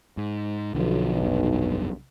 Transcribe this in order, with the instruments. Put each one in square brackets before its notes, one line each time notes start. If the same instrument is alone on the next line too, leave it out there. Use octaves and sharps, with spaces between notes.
[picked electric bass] G#2
[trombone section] B1 [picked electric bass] D3 E3 F3
[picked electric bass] F1 G2